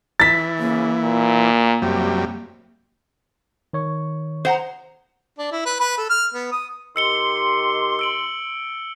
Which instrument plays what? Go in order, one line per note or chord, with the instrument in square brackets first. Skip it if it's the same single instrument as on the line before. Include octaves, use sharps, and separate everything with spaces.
[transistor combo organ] E3 [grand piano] A6 B6
[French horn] C#3 [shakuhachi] A#3
[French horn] A#2
[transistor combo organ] F#2 G3 [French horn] C3
[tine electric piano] D#3 C#5 C#6
[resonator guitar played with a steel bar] C5 F#5 A#5
[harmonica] D4
E4
B4
B4
A4
F6
B3
D#6
[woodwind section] D#3 G4 C6 [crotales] E6 C#7 G7
[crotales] E6 D7 F#7